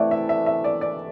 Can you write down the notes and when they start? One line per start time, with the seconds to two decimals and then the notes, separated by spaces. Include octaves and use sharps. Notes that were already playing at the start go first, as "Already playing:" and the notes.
Already playing: C3 E3 A3 D5
0.11 E5
0.29 E5
0.46 E5
0.64 D5
0.81 D5